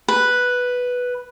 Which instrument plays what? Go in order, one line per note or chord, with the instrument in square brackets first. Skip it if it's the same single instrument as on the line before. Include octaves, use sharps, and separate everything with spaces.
[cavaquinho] B4